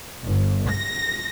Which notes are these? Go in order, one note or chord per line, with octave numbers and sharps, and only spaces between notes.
G1
A#6